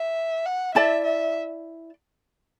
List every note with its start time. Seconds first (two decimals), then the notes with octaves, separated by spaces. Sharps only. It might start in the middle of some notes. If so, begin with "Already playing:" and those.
Already playing: E5
0.46 F#5
0.74 E4 D5 E5 A5
1.04 E5